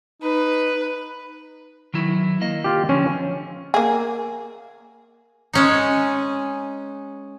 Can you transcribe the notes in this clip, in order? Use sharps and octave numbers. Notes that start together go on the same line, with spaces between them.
D#4 B4
D#3 F#3 E4
A#3 D#5
F4 G4
D3 F3 C#4
A#3 G#4
G#3 C#4 D#4